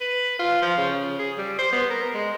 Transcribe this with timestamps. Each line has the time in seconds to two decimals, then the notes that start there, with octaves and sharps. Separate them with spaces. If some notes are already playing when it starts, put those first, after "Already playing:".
0.01 B4
0.39 F4
0.62 F3
0.78 C#3
1.19 G#4
1.38 G3
1.59 C5
1.73 B3
1.90 A#4
2.14 G#3